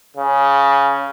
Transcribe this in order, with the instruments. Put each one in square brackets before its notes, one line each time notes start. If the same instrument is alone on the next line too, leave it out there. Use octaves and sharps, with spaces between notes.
[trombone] C#3